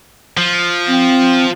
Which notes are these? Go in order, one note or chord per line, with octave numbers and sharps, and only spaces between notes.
F3
C4